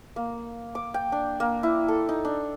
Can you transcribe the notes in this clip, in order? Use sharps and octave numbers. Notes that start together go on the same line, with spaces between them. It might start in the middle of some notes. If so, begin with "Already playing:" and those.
A#3
D6
G5
D4
A#3
E4
A4
D#4
D4